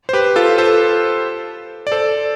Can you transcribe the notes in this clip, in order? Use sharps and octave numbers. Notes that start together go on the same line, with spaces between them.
C5
G4 B4
F4 A4
A4 C5
D5
A4 C5